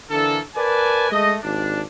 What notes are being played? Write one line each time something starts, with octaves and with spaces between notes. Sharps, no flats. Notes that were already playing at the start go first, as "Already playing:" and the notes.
D3 E3 A#3 A4
A#4 B4 D5 G#5 A5
G#3 A3 D#5
G#1 D#2 D4